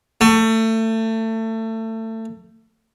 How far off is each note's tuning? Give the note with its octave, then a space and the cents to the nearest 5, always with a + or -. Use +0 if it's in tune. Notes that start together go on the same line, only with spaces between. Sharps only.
A3 +25